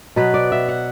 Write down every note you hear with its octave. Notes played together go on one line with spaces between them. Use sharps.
B2 F#3 B3 B4
D5
E5
F#5